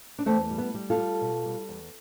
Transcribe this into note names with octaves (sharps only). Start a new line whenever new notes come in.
D4
E2 A3 C4
G3
B3
G3
F4 A4
G3
B2
G3
E2